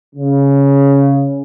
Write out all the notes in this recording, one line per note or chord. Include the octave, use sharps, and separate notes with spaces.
C#3